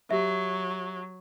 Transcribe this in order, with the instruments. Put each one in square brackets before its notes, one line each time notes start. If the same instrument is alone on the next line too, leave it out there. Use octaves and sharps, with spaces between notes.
[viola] F#3 [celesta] G4 E5